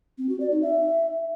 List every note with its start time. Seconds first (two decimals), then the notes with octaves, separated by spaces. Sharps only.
0.18 C4
0.29 F#4
0.40 D5
0.51 D#4
0.62 E5